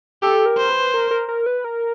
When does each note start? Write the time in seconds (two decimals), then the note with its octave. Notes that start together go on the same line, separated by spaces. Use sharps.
0.22 G4 A4
0.46 A#4
0.58 C5
0.70 B4
0.94 A#4
1.11 A#4
1.29 A#4
1.46 B4
1.64 A#4